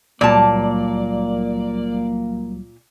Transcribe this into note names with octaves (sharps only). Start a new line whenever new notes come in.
C#2 A#2 F#3 G3 A#3 D5 A5